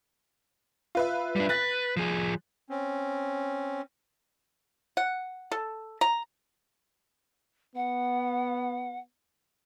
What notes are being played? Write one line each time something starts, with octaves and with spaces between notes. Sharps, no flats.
F4 B4 E5
G3 D4
B4 F#6 A6
F3 G#4
C4 C#4
F#5
A4
A#5
B3 F#5